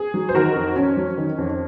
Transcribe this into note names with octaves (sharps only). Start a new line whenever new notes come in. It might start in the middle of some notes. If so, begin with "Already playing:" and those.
Already playing: G#4
F#3
C5
D#3 F#4 A#4
F2
F2 C#4
F#3
D#3
F2